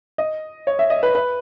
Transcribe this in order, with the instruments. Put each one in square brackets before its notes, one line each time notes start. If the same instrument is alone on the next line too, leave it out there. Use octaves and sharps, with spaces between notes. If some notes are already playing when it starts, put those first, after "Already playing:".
[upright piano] D#5
C#5
E5
D#5
B4
B4